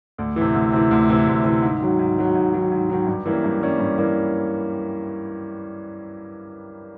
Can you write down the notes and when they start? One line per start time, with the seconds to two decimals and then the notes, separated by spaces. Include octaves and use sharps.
0.18 D2
0.36 C3 E3
0.54 D2
0.72 C3 E3
0.91 D2
1.09 C3 E3
1.27 D2
1.44 C3 E3
1.62 G#2
1.80 D#3 F#3
1.99 G#2
2.18 D#3 F#3
2.35 G#2
2.53 D#3 F#3
2.72 G#2
2.89 D#3 F#3
3.07 G2
3.26 E3 G3 A#3 C#4
3.44 G2
3.61 E3 G3 A#3 C#4
3.79 G2
3.98 E3 G3 A#3 C#4